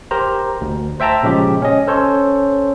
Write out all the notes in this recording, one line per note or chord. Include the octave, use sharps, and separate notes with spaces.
G4 A#4 C5 A#5
D2
C5 E5 G5 A5 A#5
A#2 C#3 F3 G#3 G4
C#4 D#5
C#4 A4 C5 C#5